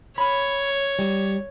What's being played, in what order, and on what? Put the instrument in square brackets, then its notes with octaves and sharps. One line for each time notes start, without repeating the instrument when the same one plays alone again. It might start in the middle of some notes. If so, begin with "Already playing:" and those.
[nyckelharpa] C#5 [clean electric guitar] B5
[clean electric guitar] G3